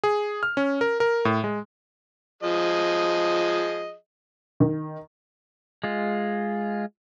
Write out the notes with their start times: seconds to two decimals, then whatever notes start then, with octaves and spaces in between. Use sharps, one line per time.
0.04 G#4
0.43 F6
0.57 C#4
0.81 A#4
1.00 A#4
1.25 A2
1.44 G#3
2.43 F3 G#4 D#5
4.60 D#3
5.84 G#3 F4